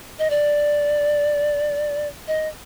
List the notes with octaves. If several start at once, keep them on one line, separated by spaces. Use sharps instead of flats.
D#5
D5
D#5